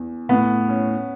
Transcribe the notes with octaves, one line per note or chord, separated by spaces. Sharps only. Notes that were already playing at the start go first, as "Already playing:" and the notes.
Already playing: E2
A2 B3
C#4